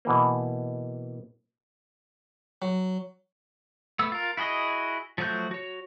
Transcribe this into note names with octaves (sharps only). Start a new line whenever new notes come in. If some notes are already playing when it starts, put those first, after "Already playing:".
B2 E3 A#3
F#3
A3 B3 E6
F4 A#4
E4 F#4 G#4 D#5
F3 F#3 A3 F#4 G6
F#4 C#5